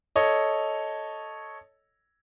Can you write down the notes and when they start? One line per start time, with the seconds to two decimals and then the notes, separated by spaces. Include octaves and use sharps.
0.16 A4 C#5 D#5